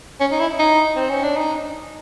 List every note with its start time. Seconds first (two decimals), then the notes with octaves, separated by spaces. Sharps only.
0.21 C#4
0.32 D#4
0.40 E4
0.59 D#4
0.96 C4
1.10 C#4
1.23 D4
1.37 D#4